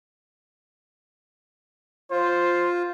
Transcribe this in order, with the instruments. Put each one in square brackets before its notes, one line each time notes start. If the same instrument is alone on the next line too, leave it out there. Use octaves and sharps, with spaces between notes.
[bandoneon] F4 [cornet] C5